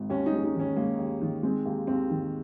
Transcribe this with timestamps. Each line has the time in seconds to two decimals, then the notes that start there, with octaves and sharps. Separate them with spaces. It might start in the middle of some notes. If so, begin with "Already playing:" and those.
Already playing: G#1
0.09 D#2 C#4
0.26 D#4
0.32 G#3
0.38 C#4
0.43 D#4
0.55 D#3 C#4
0.76 G#3 A#3
0.99 D#2
1.21 D#3
1.43 G#3 C4
1.65 D#2 A#3
1.87 D#2 C4
2.10 D#3